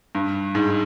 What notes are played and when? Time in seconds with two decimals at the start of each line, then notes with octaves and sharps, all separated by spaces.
0.15 G2
0.55 G#2